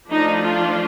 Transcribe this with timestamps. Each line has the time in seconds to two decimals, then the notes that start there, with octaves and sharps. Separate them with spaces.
0.11 F3 A3 D4 D#4
0.41 F4